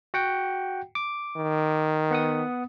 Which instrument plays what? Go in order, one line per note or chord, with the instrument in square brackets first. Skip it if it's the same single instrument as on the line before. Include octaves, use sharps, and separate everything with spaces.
[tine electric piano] F#4 F#5 G5
D6
[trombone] D#3
[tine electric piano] B3 F#5 D#6